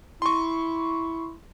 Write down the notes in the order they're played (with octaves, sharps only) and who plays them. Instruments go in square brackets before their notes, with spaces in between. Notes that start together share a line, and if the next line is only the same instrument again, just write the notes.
[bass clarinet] E4 [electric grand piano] C6 C#6